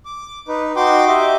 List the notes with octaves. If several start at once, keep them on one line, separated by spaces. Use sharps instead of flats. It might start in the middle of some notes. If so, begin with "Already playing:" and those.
D6
D#4 B4
D#4 F#4 G5 C6 D6
G4 D#5 E5 D6